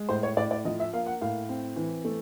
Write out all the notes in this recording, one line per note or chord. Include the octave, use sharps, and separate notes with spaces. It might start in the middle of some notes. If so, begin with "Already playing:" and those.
Already playing: G#3
A2 C5
C#5
A2 D5
D5
F3 D#5
E5
A#3 F5
F#5
A2 F5
C4
E3
A3